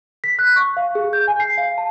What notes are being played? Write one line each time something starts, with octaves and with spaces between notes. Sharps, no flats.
B6
F#6
C#6
F5
G#4
G6
G#5
C7
F5
A5